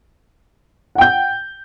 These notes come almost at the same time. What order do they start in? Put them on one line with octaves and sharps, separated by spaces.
F#5 G5 G6